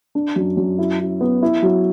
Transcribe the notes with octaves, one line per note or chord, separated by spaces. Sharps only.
D4
F#2
F#2
E4
E4
B3
E4
F#3